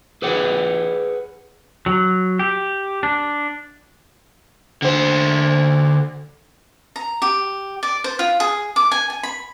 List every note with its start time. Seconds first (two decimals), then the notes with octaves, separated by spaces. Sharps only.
0.22 G#4 B4 C#5 F#5
1.86 F#3
2.39 G4
3.03 D4
4.82 D3 C5
6.96 A#5
7.22 G4
7.83 D5
8.04 C5
8.19 F4
8.40 G#4
8.76 D6
8.92 G#5
9.10 G#5
9.23 B5